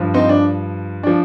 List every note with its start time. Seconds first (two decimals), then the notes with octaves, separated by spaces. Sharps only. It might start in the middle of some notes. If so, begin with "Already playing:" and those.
Already playing: G2 F3
0.14 C4 D#4
0.29 D4
1.03 F3 D4